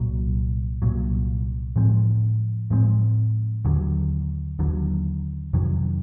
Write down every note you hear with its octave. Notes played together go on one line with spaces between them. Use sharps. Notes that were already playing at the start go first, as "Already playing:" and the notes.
Already playing: C2 A#2 F#3
C2 A#2 F#3
A2 F3 G#3 C4
A2 F3 G#3 C4
D#2 D3 F#3
D#2 D3 F#3
F2 C3 D#3 F#3